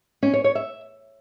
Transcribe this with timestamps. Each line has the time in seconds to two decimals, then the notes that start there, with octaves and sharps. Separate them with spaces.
0.23 C#4
0.33 C#5
0.44 C#5
0.55 E5